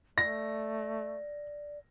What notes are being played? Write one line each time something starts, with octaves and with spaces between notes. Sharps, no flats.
A3 D5 A#6